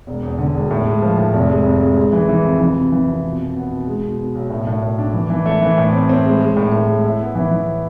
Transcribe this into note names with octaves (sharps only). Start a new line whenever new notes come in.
E1
E2
D3
E1
A2
G#3
F3
A2
F1
G#3
F2
G#3
G#3
E3
E3
F2
E3
C3
E3
F2
B2
B2
B3
B2
G#3
B2
B2
B1
A2
A2
A2
D4
E3
E3
A3
E3
A2
C4
C4
G#3
G#3
A2
A2
G#3
E4
B3
E3
E3